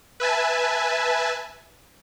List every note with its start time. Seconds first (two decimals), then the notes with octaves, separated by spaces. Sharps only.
0.20 B4 E5 G#5 A5